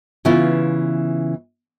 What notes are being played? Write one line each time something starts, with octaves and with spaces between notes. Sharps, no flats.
C#3 E3 B3 E4 F4